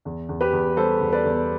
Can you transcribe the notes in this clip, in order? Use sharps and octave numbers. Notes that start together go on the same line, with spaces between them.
E2
E2
G4 B4
E2
G3 A4 C5
E2
B4 D5
E2